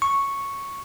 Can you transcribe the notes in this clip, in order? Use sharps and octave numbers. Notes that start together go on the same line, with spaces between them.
C#6